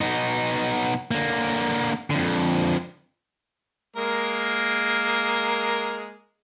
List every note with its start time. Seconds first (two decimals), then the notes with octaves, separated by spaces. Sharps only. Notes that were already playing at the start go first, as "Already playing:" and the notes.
0.01 B2 D#4
1.11 D3 A#3
2.10 F2 D3
3.96 G#3 A#3 A#4